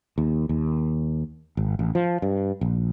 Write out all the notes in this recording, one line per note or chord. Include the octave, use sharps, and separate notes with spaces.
D#2
D#2
G#1
A1
F3
G2
A#1